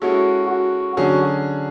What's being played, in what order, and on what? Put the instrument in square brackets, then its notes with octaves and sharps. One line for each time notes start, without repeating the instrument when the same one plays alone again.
[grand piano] G#3 C#4 E4 A4 [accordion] F#4
[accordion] F#4
[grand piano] D3 F#3 C#4 G#4 [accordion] F#4